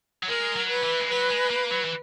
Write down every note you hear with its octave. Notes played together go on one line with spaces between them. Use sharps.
F#3
G#3 A#4
F#3
B4
E3
G#3
F#3 B4
G#3
A#3
F#3
E3